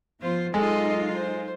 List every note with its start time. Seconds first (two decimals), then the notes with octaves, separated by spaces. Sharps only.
0.22 F3 B3 F4 C5
0.54 F#3 G#3 D#4 F4 A4 D#5
1.14 C5